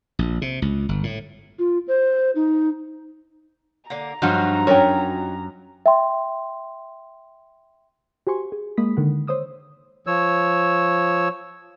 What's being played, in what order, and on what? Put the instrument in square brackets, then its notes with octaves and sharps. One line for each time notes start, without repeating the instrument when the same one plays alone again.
[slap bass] A#1
C3
C#2
G1
A2
[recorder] F4
C5
D#4
[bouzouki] D3 A#3 [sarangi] A#5
[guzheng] G2 F3 F#3 [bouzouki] D#4 F4 F#4
[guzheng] F#2 G#5 [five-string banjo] G4 A#4 C#5
[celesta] E5 G5 C6
[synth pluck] F#4 G4 C5 G#5 C6 C#6
G#4
G#3 A#3 B5 D#6 B6
D3 D#3 F#5
C5 C#5 D#6 E6
[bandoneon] F3 C#5 E6